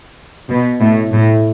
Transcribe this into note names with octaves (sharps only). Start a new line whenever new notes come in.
B2
A2
A2